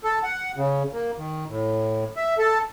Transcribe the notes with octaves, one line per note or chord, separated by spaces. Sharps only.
A4
F#5
C#3
A#3
D#3
A2
E5
A4